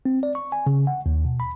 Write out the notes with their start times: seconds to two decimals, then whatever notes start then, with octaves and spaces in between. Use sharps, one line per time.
0.05 C4
0.23 D5
0.35 C#6
0.52 G#5
0.66 C#3
0.87 F#5
1.06 D#2
1.25 B2
1.40 B5